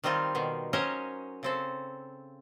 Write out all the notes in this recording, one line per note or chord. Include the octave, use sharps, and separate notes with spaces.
D#3 G3 C4 D#4 F4
B2 D#3
F#3 C#4 A#4 C5 C#5 D#5
C#3 C4 A4